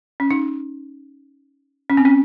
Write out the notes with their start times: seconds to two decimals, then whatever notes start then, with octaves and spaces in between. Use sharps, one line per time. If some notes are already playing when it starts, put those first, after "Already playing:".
0.20 C#4
0.31 D#4
1.90 C#4
1.97 C4
2.05 C#4